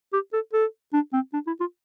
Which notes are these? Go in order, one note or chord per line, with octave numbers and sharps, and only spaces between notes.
G4
A4
A4
D4
C4
D4
E4
F4